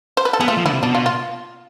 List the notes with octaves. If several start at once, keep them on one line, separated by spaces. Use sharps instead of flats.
C5
B4
A4
B3 G#4
A3 F4
F3
D3 E4
C3
B2 D4
F4
F4